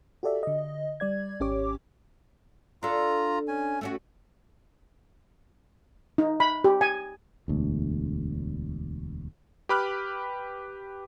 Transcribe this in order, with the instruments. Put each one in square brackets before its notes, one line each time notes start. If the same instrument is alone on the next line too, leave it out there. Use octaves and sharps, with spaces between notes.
[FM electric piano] F#4 G4 A4 D5 E5
D3 D#5
G3 D5 G#6
G#1 C#4 G4 C#5 D6
[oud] D4 A4 [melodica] F4 A#5
[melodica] C#4 G#5
[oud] A3 C#4 F#4
[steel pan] D#4
B5
G4
G#5
[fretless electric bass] E1 D2
[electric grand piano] G4 B4 B5 D6 F6 F#6